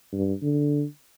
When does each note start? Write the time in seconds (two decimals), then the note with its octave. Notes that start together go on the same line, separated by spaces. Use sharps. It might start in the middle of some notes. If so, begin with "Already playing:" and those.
0.12 G2
0.42 D3